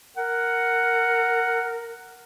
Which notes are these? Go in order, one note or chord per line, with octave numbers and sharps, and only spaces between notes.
A#4 F#5